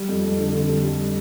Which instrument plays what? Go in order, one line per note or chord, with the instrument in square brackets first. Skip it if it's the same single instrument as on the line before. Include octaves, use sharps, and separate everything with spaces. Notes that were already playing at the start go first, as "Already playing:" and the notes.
Already playing: [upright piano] G3
F2
F2
D3
D3
G3
G3